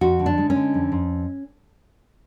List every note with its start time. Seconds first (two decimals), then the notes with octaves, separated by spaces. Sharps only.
0.01 F2 F#4
0.19 D3
0.26 D4
0.38 G#3
0.50 C#4
0.55 D3
0.74 F2
0.92 F2